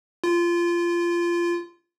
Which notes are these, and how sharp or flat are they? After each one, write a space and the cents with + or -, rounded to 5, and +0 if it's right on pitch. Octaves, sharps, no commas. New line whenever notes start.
F4 -20